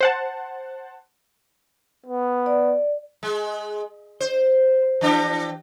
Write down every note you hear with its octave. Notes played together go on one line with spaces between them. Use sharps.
C5 F#5 A5
B3
D5
G#3
C5
E3 D4 G4